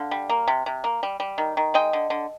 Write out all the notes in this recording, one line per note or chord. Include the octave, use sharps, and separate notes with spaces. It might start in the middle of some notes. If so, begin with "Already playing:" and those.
Already playing: D3 F5
G3
A#3
C3
C3
A#3
G3
G3
D#3
D#3
G#3 D#5 G5
D3
D3